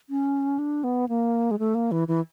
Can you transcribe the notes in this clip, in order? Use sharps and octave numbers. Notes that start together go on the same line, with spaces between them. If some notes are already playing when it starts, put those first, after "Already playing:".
C#4
D4
B3
A#3
G#3
A3
A#3
E3
E3